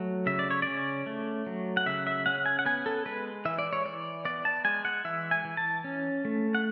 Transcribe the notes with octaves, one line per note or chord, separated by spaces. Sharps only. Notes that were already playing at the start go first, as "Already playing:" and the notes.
Already playing: F#3 A3
C#3 E5
D5
C#5
C#4 D5
A3
F#3
F#5
C#3 E5
E5
C#4 F#5
G#5
F#5
B3 G#5
A4
G#3 B4
E3 E5
D5
C#5
E3 D5
B3 D5
A5
G#3 G#5
F#5
E3 E5
G#5
E3
A5
C#4
A3
F#5